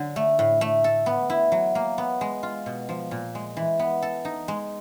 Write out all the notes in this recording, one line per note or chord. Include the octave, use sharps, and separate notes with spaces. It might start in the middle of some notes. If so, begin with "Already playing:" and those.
Already playing: D3 F#3
A3
A2
A3
A4
B3
E4
F#3
A#3
B3
G#3
F4
B2
F3
A#2
G#3
E3
B3
A4
D#4
G#3